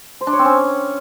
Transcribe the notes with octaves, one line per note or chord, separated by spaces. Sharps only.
C5
D4
C#5
C4
C#4